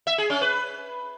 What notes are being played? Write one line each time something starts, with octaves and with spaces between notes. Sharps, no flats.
E5
G#4
C#4
B4